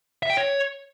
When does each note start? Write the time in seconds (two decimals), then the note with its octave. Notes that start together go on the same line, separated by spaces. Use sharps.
0.23 E5
0.30 G5
0.37 C#5